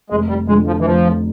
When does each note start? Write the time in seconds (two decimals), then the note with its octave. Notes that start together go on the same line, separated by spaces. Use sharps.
0.10 F1 G#3
0.29 G3
0.48 F2 D3 G#3
0.66 F3
0.81 E3
0.85 F1 F3